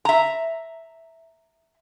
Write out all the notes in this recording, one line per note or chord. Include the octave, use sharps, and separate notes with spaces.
E5 A#5